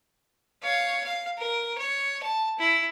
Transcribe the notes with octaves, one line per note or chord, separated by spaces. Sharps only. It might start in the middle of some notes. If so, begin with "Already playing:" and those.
C#5 F5
F5
A#4
C#5
A5
E4